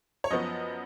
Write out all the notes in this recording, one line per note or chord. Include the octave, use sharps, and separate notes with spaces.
C#5
F#2 F3 B3 D#5